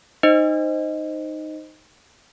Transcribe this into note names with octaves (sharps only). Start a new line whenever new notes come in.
D#4 C5 D#5